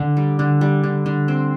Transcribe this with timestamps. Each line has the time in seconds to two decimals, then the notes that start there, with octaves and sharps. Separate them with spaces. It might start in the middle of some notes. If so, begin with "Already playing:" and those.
Already playing: D3
0.17 G3
0.39 D3
0.61 G3
0.84 D3
1.06 D3
1.28 C4